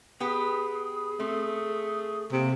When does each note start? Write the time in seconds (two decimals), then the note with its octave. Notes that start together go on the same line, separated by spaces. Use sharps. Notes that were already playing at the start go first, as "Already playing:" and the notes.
0.20 B3 G4 G#4 B4
1.20 A3 C4
2.32 C3 A#3